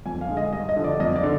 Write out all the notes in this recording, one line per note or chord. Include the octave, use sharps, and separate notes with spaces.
F2 G#5
F5
D3 G#3
D#5
G2 D#5
D#5
D3 F3
D5
F2 D#5
D#5
D5
D3